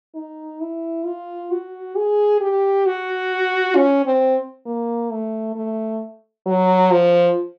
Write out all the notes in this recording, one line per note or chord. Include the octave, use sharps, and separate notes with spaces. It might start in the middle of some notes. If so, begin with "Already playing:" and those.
D#4
E4
F4
F#4
G#4
G4
F#4
C#4
C4
A#3
A3
A3
F#3
F3